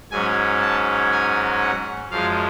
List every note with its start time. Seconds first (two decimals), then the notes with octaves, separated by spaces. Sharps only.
0.11 G#2 F#3 C#4 G#5
0.62 A5
1.12 G#5
1.61 F#5
2.11 F#2 F3 G#3 F5